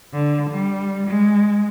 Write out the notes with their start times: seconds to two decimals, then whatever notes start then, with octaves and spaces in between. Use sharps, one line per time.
0.13 D3
0.51 G3
1.08 G#3